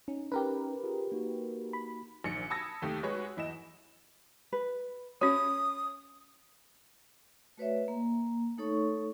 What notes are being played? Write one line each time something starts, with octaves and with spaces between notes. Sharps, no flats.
C#4 D#4
C#4 D#4 G4 A#4 B4
F4 G#4
A#3 D#4 F#4
B5
A#1 D#3 C#7
A5 B5 D#6 E6 G#6 A#6
D#2 C3 A3 G4
G#3 F#4 B4 C#5
E2 E4 D#5 E7
B4
C#4 F#4 C#5 D#6
A3 F#4 B4 C#5 D5 E5
A#3
A3 D#4 A4 C#5 C#6